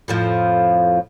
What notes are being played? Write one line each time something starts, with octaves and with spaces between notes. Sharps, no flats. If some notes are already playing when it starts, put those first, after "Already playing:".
F2 A2 F3